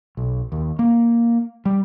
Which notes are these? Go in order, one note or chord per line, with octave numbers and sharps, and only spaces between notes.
B1
D#2
A#3
G3